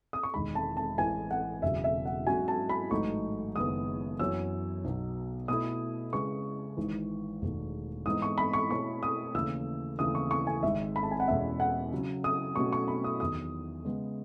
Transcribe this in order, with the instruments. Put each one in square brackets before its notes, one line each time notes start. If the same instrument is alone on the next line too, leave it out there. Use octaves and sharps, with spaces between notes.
[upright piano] D#6
C#6
[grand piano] E1 E2 D#3 G#3 [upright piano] B5
[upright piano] A5
A5
[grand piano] A1 A2 E3 G#3 [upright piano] G#5
[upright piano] F#5
[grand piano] E1 E2 C#3 F#3 [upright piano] E5
[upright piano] E5
F#5
[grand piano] G#2 F#3 C#4 F#4 [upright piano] G#5
[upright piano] A5
B5
[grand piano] A1 G#2 F#3 A3 D#4 [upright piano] C#6
[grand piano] F#1 F#2 D#3 G#3 B3 [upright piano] D#6
[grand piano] F#2 E3 B3 F#4 C#5 [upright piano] E6
[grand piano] B1 B2 F#3
[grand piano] B2 A3 E4 A4 [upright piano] D#6
[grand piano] C#3 G#3 C#4 G#4 B4 [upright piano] C#6
[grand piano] G#1 G#2 E3
E1 E2 D#3 A3
[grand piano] G#2 E3 G#3 B3 D#4 [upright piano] D#6
[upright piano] C#6
B5
C#6
[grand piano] B2 A3 E4 A4 C#5 [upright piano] C#6
[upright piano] D#6
[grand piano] D#2 C#3 E3 A3 C#4 [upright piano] E6
[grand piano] D#2 C#3 E3 A3 [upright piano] D#6
[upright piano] C#6
C#6
G#5
[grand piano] G#1 G#2 D#3 G#3 [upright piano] E5
[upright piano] B5
A5
G#5
F#5
[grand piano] E2 B2 G#3 C#4 [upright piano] E5
[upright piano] F#5
[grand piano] C#3 F#3 C#4
[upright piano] D#6
[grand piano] B2 F#3 A3 C#4 F#4 [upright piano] C#6
[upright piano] C#6
B5
D#6
[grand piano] E2 D#3 F#3 [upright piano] D#6
[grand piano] C#3 G#3 B3